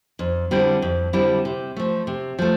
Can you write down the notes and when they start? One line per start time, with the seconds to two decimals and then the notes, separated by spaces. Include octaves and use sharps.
0.19 F2
0.51 D3 G3 C4 E4
0.82 F2
1.13 D3 G3 C4 E4
1.45 C3
1.76 F3 A3
2.07 C3
2.39 F3 A3